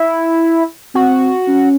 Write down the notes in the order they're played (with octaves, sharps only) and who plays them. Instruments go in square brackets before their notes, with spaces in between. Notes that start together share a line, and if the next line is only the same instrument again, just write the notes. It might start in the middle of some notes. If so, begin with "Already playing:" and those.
Already playing: [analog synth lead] E4
[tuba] C4 [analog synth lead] F#4
[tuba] C#4